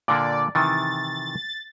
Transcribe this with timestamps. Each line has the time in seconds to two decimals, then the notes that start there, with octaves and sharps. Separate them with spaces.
0.08 A#2 D3 A#3 D5
0.55 C3 D#3 E3 A6